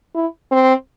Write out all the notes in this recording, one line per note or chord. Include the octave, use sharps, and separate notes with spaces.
E4
C4